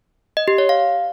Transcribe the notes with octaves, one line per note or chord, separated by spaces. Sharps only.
D#5
G4
C#5
F5